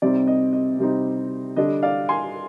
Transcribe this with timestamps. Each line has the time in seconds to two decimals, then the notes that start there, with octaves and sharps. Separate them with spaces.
0.02 C3 G3 C4 D#4 D5
0.27 D#5
0.53 D#5
0.79 C3 G3 C4 D#4
1.57 D3 G3 D4 D#5
1.83 D5 F5
2.09 G#5 C6